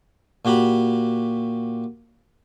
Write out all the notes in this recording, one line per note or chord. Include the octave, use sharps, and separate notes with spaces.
A#2 F#4 G4 B5